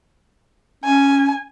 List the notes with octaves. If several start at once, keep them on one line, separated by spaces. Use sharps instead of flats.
C#4 G#5